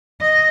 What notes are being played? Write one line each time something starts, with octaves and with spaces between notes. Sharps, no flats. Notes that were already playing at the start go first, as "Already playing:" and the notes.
D#5